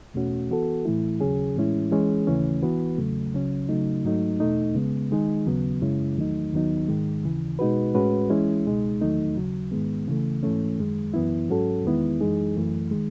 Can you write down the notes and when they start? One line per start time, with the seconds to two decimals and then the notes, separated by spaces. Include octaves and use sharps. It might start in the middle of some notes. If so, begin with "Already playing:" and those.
0.14 E2 B2 A3 C#4 F#4
0.50 E3 B3 F#4 A4
0.85 A2 E3 A3 E4
1.21 D#2 C#3 F#3 C#4 G#4
1.56 A2 E3 G#3 C#4 E4
1.91 E3 G#3 C#4 G#4
2.27 D#2 C#3 E3 A3 C#4
2.63 E3 B3 F#4 B4
2.98 E2 C#3 F#3 A3
3.33 C#2 C#3 F#3 C#4
3.69 C#3 F#3 A3 D#4
4.04 G#2 F#3 A3 D#4
4.40 E2 B2 A3 D#4
4.75 C#3 G#3 B3
5.11 D#3 G#3 D#4 G#4
5.46 D#2 C#3 F#3 B3
5.81 F#2 C#3 G#3 C#4 E4
6.17 E2 D#3 F#3 A3 D#4
6.53 D#2 D#3 F#3 B3 D#4
6.88 G#2 D#3 G#3
7.24 D#2 C#3 E3
7.59 B2 G#3 D#4 F#4 B4
7.94 A2 G#3 C#4 F#4 B4
8.30 E3 G#3 C#4 E4
8.65 C#2 B2 G#3 D#4
9.02 E2 D#3 F#3 A3 D#4
9.36 D#2 C#3 F#3
9.71 G#2 D#3 G#3 B3
10.08 C#3 E3 A3
10.43 G#2 E3 A3 C#4
10.78 F#2 D#3 G#3
11.14 F#2 E3 B3 E4
11.49 G#2 F#3 C#4 F#4 A4
11.84 E2 D#3 G#3 B3 E4
12.21 F#2 E3 G#3 D#4 G#4
12.56 F#2 E3 A3
12.91 D#3 G#3